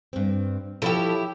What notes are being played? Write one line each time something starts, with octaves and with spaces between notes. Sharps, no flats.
G2 C4
F3 E4 G4 A4 C#5